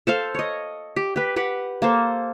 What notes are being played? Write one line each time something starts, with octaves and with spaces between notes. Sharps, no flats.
A4 C5 F5
C#5 D#5
G4
G4 B4
G4 B4 F#5
A#3 A4 C5